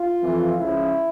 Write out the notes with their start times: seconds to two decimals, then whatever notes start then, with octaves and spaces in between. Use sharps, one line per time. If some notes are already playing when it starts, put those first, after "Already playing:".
Already playing: F4
0.22 F2 E3
0.58 C#2 C#3 F3 E4